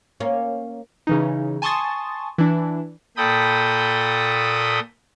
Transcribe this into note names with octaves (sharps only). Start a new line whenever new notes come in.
A#3 C#4
C#3 E3 D#4
G#5 A5 C6 C#6 D#6 A6
E3 D4
A#2 A4 G5 B5 D#6